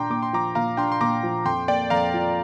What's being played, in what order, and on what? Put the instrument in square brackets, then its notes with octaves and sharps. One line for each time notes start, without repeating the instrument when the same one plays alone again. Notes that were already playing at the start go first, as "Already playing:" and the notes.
Already playing: [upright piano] A#2 D4 [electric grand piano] G5 A#5 C6 D6
[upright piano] A#2 [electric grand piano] D6
[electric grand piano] C6
[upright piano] F3 [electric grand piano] A#5 D6
[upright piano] A#2 [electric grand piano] F5 A#5
[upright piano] D4 [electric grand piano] G5 C6
[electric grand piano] C6
[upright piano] A#2 [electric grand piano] A#5 D6
[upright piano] F3
[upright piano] F2 [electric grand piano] G5 C6
[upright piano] A#3 [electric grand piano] D5 G5
[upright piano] F2 [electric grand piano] F5 A#5
[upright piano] F3